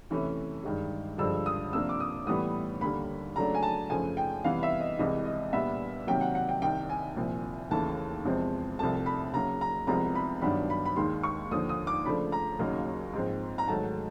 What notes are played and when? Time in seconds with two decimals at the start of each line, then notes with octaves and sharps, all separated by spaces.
0.10 C3 E3 A3 C#4 E4
0.64 G2 D#3 G#3
1.18 G2 D3 F3 G#3 E6
1.46 D#6
1.72 C3 F3 A#3 D4 E6
1.89 D6
2.00 D#6
2.27 A2 E3 G3 B3 D#6
2.81 D#2 D3 G3 A#3 B5
3.36 C#3 F#3 A3 D4 A#5
3.55 G#5
3.63 A5
3.90 F#2 C#3 F3 A3 G#5
4.17 G5
4.44 C3 E3 G3 B3 F5
4.63 E5
4.80 D#5
4.99 C2 C3 E3 G#3 D#5
5.25 D#5
5.53 A#2 G3 B3 D4 E5
6.07 C3 D#3 F#3 A#3 G5
6.21 F#5
6.35 F#5
6.49 G5
6.62 C2 C3 D#3 G5
6.90 G#5
7.16 C2 A#2 F3
7.70 D#2 C#3 E3 A3 A5
8.25 E2 C3 F3 G#3 C4
8.79 C2 C3 F3 A3 A5
9.06 B5
9.33 C#3 F#3 A#3 A#5
9.61 A#5
9.87 C2 C3 F3 G#3 B3 A#5
10.15 B5
10.42 G2 D#3 F#3 B3 D4 B5
10.70 B5
10.85 B5
10.96 D#2 D#3 G#3 C6
11.23 C#6
11.51 D#2 D3 F3 D#6
11.69 D#6
11.87 D6
12.05 C#3 F3 A3 D4 B5
12.32 A#5
12.59 D#2 C#3 F#3 A#3 D#4
13.14 G#2 F3 G#3 C4
13.58 A#5
13.68 G#2 D#3 F#3 A3 A5